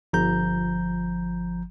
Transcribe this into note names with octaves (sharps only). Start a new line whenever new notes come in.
G1 F3 A#5 G6